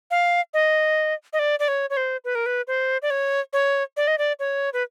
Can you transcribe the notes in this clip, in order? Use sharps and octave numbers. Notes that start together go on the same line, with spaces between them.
F5
D#5
D#5
D5
D5
C#5
C#5
C5
B4
A#4
B4
C5
D5
C#5
C#5
D5
D#5
D5
C#5
B4